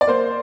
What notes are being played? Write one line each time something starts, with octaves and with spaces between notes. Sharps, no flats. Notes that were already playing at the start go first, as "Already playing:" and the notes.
D5
A#3 C5